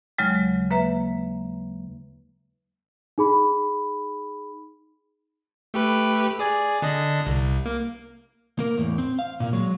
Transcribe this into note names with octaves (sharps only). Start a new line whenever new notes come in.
D#2 C#3 F#3 G#3
A#3 B4 E5 A#5
D#4 G#4 B5
A3 G4 B4
G#4 D5 G#5
D3 D4 D#5
C2
A#3
A#3 A#4
E2 A2
C4
F5
A#2 A#3
F#3 G#3